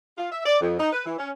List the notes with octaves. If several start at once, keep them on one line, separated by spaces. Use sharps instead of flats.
F4
E5
D5
F2
D#4
B4
E3
C#4